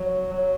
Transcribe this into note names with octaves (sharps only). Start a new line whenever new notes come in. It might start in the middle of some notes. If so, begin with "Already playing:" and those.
Already playing: F#3
F#3